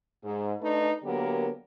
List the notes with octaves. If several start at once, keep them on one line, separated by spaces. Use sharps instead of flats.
G#2
A3 D4 D#4 B4
D3 F#3 A#3 B3 G4 A#4